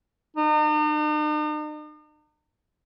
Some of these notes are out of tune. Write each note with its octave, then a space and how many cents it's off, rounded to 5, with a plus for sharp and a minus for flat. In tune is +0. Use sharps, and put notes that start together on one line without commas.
D#4 -45